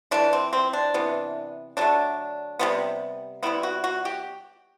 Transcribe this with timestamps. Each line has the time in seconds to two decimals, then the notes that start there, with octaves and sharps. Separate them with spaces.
0.11 E3 A3 D4
0.33 C4
0.53 C4
0.73 D4
0.94 C3 E3 B3
1.77 D3 F#3 A3 D4
2.59 C3 E3 G3 B3
3.43 C3 E3 G3 B3 E4
3.63 F#4
3.84 F#4
4.05 G4